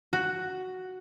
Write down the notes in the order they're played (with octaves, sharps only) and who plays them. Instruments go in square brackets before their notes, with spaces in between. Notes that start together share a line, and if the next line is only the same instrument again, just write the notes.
[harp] F#4